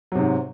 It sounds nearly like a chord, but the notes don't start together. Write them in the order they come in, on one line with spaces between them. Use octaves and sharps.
F#3 C3 G#2